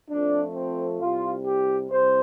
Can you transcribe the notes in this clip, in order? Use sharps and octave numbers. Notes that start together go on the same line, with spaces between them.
F2 F3 A3 D4
C4
C2 C3 G3 F4
G4
C2 C3 G3 C5